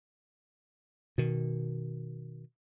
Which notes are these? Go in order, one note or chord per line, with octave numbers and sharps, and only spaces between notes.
B2 D#3